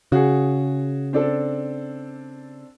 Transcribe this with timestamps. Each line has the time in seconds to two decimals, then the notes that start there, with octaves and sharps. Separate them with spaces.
0.12 C#3 F#4 G#4
1.13 C4 D4 A4